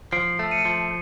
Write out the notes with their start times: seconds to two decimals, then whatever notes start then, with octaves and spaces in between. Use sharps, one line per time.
0.12 F3 C7 D7
0.39 A3
0.51 C#7 D#7
0.65 F3